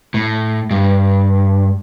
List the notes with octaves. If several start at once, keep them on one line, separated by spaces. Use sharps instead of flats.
A2
G2